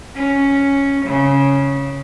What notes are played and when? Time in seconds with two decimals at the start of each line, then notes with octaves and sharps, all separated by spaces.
0.16 C#4
1.07 C#3